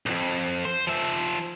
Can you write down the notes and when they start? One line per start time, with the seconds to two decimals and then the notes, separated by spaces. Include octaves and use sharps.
0.06 B1 F2
0.65 C5
0.87 F3 E5